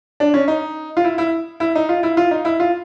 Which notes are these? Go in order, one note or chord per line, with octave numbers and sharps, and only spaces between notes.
D4
C#4
D#4
F4
E4
E4
E4
D#4
F4
E4
F4
D#4
E4
F4